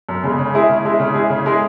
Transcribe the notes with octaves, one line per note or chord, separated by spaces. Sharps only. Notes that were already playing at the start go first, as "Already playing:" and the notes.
F#2
C#3 G#3 B3
C#3
G#3 E4 G#4
C#3
G#3 E4 G#4
C#3
G#3 E4 G#4
C#3
G#3 E4 G#4